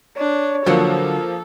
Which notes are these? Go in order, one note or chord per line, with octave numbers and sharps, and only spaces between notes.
D4 C#5
D3 F3 F#3 A#3 F#4 A4